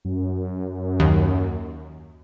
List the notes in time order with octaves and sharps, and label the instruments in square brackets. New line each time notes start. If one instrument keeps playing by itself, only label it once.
[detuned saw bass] F#2
[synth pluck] D#2